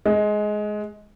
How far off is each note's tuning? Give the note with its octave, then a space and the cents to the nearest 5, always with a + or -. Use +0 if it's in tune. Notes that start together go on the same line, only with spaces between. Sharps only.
G#3 +15